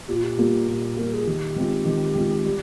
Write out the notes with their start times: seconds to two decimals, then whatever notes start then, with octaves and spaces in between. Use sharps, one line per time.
0.08 A#2 G4
0.16 F4
0.23 G4
0.38 G3 A#3 F4
0.68 A#2
0.97 G3 A#3 F4 A#4
1.13 G#4
1.27 D#3 G4
1.56 G#3 C4 F4
1.85 D#3
2.16 G#3 C4 F4
2.45 G3